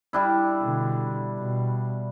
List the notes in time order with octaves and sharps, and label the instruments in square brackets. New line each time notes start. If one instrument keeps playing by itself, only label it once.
[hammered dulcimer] G3 D4 E4
[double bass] B2 D3
B2